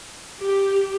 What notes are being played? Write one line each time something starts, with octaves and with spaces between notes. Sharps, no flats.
G4